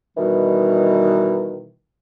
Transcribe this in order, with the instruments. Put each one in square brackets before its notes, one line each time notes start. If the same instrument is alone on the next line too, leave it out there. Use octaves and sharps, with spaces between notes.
[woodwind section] B2 D#3 E3 G3